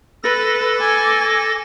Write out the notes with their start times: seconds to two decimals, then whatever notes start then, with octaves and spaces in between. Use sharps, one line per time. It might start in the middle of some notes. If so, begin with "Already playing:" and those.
0.23 A4 B4 A6 A#6
0.80 G#5 D6